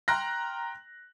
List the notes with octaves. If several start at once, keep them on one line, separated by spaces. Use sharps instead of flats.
G5 A#5 C6 F6 F#6 A#6